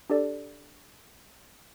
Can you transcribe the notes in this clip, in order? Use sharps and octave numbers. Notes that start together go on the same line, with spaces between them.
D4 G4 A4 D5